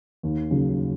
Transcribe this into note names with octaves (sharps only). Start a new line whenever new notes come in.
D#2
C#3 F#3 C#4